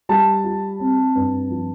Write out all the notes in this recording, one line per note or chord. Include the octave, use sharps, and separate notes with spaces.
G3 A5
F4
C4
G2
F3